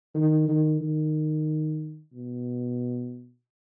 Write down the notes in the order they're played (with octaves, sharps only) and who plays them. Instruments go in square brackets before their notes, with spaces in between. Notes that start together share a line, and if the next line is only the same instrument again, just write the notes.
[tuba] D#3
D#3
D#3
B2